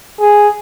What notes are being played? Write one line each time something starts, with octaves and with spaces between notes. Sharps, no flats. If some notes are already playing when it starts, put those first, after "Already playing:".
G#4